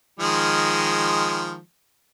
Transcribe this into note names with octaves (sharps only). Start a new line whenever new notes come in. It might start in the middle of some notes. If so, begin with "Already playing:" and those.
D#3 F3 G#3